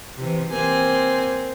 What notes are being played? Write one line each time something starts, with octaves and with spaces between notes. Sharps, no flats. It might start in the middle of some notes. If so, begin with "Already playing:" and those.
C3 E3
A#3 C4 G#5